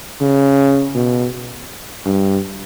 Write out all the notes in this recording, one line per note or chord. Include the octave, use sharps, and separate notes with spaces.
C#3
B2
G2